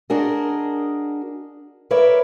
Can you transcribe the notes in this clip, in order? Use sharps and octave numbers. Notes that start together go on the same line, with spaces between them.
D4 F#4 G#4 A#4 D#5
A#4 B4 C#5 D5 E5